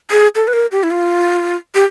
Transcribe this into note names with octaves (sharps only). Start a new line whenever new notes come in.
G#4
A4
B4
A#4
G4
E4
F4
G4